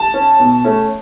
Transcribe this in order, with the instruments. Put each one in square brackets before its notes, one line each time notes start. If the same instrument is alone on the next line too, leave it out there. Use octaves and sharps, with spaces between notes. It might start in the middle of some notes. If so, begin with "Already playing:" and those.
Already playing: [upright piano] A5
C#4
B2
A3 C#4